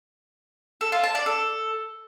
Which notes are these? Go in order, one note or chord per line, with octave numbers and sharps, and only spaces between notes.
A4
F4
A5
D5
A4